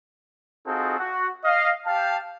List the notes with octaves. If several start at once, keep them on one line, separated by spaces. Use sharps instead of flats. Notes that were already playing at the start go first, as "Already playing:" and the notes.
C4 D#4 F4 F#4 G#4 A4
F#4
D#5 F5
G4 F5 G5 A5